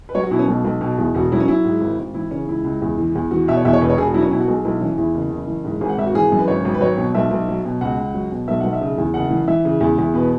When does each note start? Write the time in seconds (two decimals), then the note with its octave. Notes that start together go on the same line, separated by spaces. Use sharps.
0.09 B4
0.15 F#3 C#5
0.23 F#4
0.31 B2 E4
0.39 C#4
0.48 B1
0.65 B1
0.81 B2
0.98 E2
1.15 E1 F#4
1.32 F#3 E4
1.40 C#4
1.48 F#3 E4
1.65 G#2
1.81 G#1
1.99 G#1
2.14 E3 E4
2.31 C#3 C#4
2.47 C#2 E4
2.64 C#2
2.82 E2
2.98 E3
3.15 E2
3.31 E3 F#4
3.48 B2 E5
3.57 C#5
3.65 E2 E5
3.73 C#5
3.81 E1 B4
3.90 C#5
3.97 E1 G#4
4.06 F#4
4.14 F#3 E4
4.22 C#4
4.31 B2 E4
4.40 F#4
4.48 B1 G#4
4.65 B1 E4
4.81 E3 C#4
4.98 E2 E4
5.15 F#1
5.31 F#1
5.47 E3
5.65 G#2
5.81 G#1 G#4
5.89 F#5
5.98 G#1 E5
6.07 F#4
6.14 E3 G#4
6.32 F#2
6.39 B4
6.48 G#1 C#5
6.65 G#1
6.74 B4
6.81 F#3 C#5
6.97 B2
7.15 B1 E5
7.31 B1
7.48 F#3
7.65 B2
7.81 C#2 F#5
7.98 C#2
8.14 F#3
8.32 B2
8.48 B1 E5
8.60 B1 F#5
8.73 E5
8.81 C#3
8.98 E2
9.14 F#1 F#5
9.31 E3
9.48 E3 E5
9.65 C#3
9.81 E2
9.98 E2
10.14 B2 B4